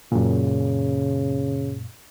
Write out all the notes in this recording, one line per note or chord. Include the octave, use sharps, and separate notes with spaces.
F#2 A#2 C#3